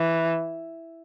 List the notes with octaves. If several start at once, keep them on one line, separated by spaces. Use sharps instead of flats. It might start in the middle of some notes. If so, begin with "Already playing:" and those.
Already playing: E3